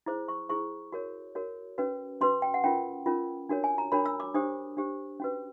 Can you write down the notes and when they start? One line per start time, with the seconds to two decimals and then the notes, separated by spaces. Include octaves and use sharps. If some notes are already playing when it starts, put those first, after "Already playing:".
0.06 E4 G#4 C5 D6
0.28 C#6
0.49 E4 G#4 C5 C#6
0.92 F#4 A#4 C#5
1.35 F#4 A#4 C#5
1.78 C#4 F#4 B4
2.21 C#4 F#4 B4 C6
2.42 G5
2.54 F#5
2.64 C#4 F4 A#4 G5
3.06 C#4 F4 A#4
3.49 D4 F#4 A#4 C#5
3.64 G#5
3.78 A#5
3.92 D4 F#4 A#4 C#5 B5
4.06 E6
4.20 D6
4.34 D4 G4 C5 D#6
4.77 D4 G4 C5
5.20 C#4 F#4 B4